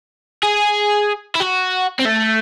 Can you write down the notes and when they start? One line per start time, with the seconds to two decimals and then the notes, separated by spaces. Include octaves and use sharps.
0.43 G#4
1.35 E4
1.40 F#4
2.00 C4
2.06 A3